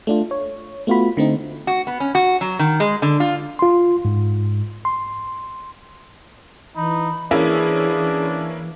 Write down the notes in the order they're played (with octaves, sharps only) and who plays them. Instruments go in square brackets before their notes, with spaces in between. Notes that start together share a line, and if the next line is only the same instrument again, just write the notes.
[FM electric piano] A3 D4 F4
C#5
A3 B3 F4 F#4 B5
D3 A3 C4 D#4
[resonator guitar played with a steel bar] F#4
B3
C#4
F#4
F#3
D#3
G#3
D3
F4
[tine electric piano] F4 C6
G#2
C6
[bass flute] E3 [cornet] D#4 [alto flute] B5
[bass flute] E3 [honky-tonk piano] A#3 C#4 E4 [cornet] D4 [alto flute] G#4